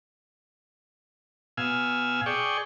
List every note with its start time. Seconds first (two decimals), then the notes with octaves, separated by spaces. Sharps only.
1.58 B2 F5 G#5 E6
2.26 G#4 D5 G5 C#6